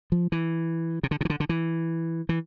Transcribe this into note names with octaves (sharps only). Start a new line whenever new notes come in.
F3
E3
C3
D3
C3
E3
D3
D3
E3
E3